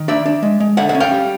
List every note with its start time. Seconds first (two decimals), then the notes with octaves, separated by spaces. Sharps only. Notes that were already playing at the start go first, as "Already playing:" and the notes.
Already playing: D#3
0.08 D4 D5 E5
0.26 D4
0.43 G#3
0.60 G#3
0.77 D3 E5 F#5
0.89 E5 F#5
0.95 C#4
1.00 F5 G5
1.12 G3